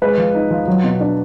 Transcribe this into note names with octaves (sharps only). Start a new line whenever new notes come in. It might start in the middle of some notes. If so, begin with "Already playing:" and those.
G#3 B4
F3
D#4
F3
F#3
B2
D4